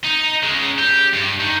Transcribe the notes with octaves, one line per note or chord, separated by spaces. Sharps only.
D#4
C#3 G#3
G4
G2
D#3